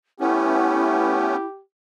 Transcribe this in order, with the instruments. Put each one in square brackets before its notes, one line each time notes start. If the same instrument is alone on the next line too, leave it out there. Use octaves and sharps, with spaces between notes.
[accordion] A3 B3 C#4 [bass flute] E4 [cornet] G4